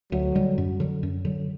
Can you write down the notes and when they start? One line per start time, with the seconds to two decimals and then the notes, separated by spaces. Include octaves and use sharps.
0.12 D2 F#3
0.35 D3 G3
0.58 F#2
0.80 D3 F#3
1.03 F#2
1.25 D3 F#3